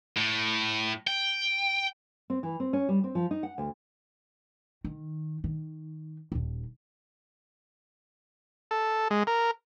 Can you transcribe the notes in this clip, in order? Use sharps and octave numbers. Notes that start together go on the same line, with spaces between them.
A2
G5
C4
E3
C4
C#4
G3
C4
F3
D#4
F#5
D2
D#3
D#3
D#1 D#2
A4
G#3
A#4